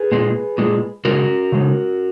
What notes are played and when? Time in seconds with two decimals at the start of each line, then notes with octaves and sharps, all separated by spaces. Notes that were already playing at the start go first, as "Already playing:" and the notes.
Already playing: G#4 B4
0.12 A#2 G#3
0.58 A#2 G#3
1.05 C#3 G#3 F#4 A#4
1.52 C#3 G#3